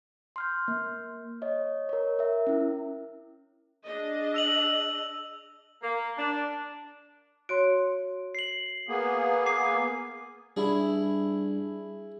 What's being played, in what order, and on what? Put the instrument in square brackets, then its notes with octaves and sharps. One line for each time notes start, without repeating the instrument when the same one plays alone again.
[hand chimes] C6 F6 G6
A#3
C#5 D#5
A#4 C#5
A#4 E5
C#4 E4
[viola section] D4 G#4 D#5
[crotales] E6 F7 F#7
[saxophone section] A#3
D4
[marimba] F#4 C#5 C6 [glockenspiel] D7
[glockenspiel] C7 F#7
[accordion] A#3 B3 G#4
[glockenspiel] G#5 D6 C7
[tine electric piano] G3 D4 [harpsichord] E4 G#4